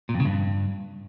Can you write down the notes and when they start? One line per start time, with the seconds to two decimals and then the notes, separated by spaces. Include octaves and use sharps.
0.09 A#2
0.14 F2
0.20 C#3
0.25 G2